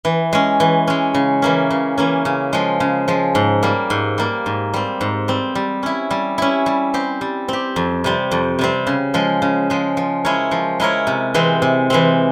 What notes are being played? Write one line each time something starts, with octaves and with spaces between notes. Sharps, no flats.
E3
G#3 C#4
E3
G#3 C#4
C#3
E3 A#3 C#4
C#3
E3 A#3 C#4
C#3
F3 G#3
C#3
F3 G#3
G#2
G3 A#3
G#2
G3 A#3
G#2
G3 C4
G#2
G3 C4
G3
C#4 E4
G3
C#4 E4
G3
C4 G4
G3
C4 G4
F2
C3 G3 C4
F2
C3 G3 C4
C#3
F3 G#3
C#3
F3 G#3
F3
G#3 E4 A#4 C#5
F3
G#3 E4 A#4 C#5
C3
E3 G#3 C4
C3
E3 G#3 C4